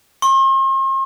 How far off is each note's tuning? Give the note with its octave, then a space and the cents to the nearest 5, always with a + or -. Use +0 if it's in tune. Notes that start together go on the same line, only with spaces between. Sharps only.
C6 +45